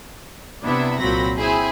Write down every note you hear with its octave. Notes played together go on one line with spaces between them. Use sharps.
C3 B3 D4 E4
C2 A#2 F#3 C4 B5 A#6
C4 E4 G#4